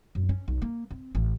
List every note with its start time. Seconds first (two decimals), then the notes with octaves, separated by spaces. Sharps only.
0.15 F#2
0.29 C#4
0.48 B1
0.62 A#3
0.91 C4
1.15 A1